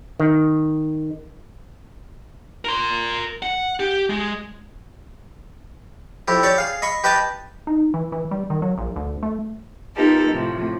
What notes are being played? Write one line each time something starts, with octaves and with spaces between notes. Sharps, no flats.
D#3
A#4 C6
F#5
G4
G#3
F2 E4 G4
G4 C#5 D5 G5
G#4 F5
D#5 B5 C#6
G4 B4 D#5 G5 A5
D#4
E3
E3
G3
D#3
F#3
A#1
D2
A3
B3 D#4 F4 G4 A4 A#4
A2 C3 F3